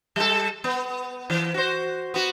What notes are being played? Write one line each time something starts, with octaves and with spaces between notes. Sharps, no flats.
G3 A4
B3
E3
F#4 C5
B3 F#4